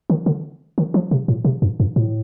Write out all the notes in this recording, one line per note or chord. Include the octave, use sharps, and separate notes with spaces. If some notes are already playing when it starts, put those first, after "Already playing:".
D#3
D3
D#3
F3
C3
A2
C3
G2
G2
A2